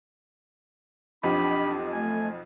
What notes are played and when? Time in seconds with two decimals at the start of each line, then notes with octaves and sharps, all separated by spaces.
1.23 B1 F2 F3 D4 G4 B5
1.92 A3 G#5